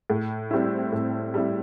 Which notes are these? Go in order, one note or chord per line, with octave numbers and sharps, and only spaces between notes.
A2
G3 C4 E4
A2
G3 C4 E4